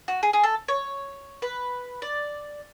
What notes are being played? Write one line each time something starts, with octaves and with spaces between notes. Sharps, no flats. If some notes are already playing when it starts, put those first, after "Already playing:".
F#4
G#4
G#4
A4
C#5
B4
D5